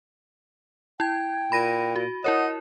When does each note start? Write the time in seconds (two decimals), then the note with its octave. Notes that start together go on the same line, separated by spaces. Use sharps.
1.00 E4 G5 G#6
1.52 A#2 B5 A#6 D#7
1.96 F#4
2.24 E4 A#4 C#5 D#5 F#5